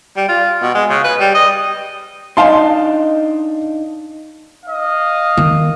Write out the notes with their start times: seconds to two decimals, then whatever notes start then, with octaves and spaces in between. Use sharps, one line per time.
0.16 G3
0.28 F4
0.62 B2
0.75 G#3
0.90 C#3
1.04 B4
1.20 G3
1.34 D#5
2.37 D4 D#4 D#5 F5 A5 C6
4.66 D#5 F5
5.37 D#3